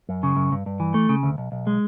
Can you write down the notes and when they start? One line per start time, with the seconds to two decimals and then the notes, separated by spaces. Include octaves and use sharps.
0.09 F#2
0.23 C#3
0.36 F#2
0.52 G2
0.66 G2
0.80 E3
0.94 A3
1.09 C#3
1.23 D2
1.38 B1
1.52 B1
1.67 G#3